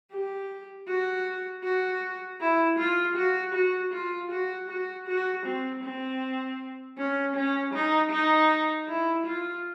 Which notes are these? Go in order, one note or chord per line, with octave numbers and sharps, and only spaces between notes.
G4
F#4
F#4
E4
F4
F#4
F#4
F4
F#4
F#4
F#4
C4
C4
C#4
C#4
D#4
D#4
E4
F4